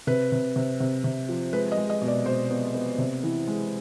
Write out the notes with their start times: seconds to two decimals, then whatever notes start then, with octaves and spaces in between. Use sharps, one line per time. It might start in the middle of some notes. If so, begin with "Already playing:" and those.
0.07 C3 B4
0.32 C3
0.56 C3
0.80 C3
1.04 C3
1.29 F3
1.53 G#3 B4
1.72 D#5
1.78 G#3
1.90 D#5
2.01 B2
2.08 D5
2.26 B2 C5
2.50 B3
2.74 B3
2.98 C3
3.23 E3
3.47 G#3